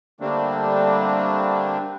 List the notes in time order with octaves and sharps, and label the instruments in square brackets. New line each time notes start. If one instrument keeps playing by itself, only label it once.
[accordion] D3 G3 A3 A#3 C4 D4